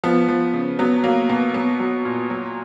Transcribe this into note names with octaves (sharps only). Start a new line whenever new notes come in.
F3 B3
F3
C#3
F#3 B3
F#3 A#3
B2 B3
F#3 B3
F#3
A#2
F#3